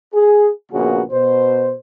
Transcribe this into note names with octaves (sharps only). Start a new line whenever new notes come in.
G#4
A#1 C#3 A#3 B3 F#4 G#4
B2 C5